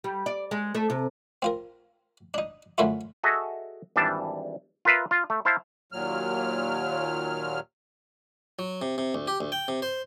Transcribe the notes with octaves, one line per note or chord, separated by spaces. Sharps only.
G3
D5
G#3
A3
C3
C4 F4 A#4
D4 D#4
F#2 D3 A3 C#4 E4 F4
F#4 G#4 A4 D#5 E5
G#1 E3 G3 D4 A5
F4 A#4 B4 E5 F5
F4
A3
E4 C5 F5 A5
D#2 A#2 F#3 F6
F#3
C3
C3
D2
G4
D2
G5
C3
C5